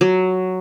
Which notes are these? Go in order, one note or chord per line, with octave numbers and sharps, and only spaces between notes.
F#3